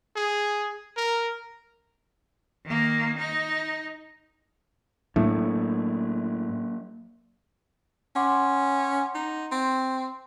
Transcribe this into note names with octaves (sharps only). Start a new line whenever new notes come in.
G#4
A#4
D#3 A#3
D#4
A2 F#3 A3 A#3 D4
C#4 F#5 C6 D6
D#4
C4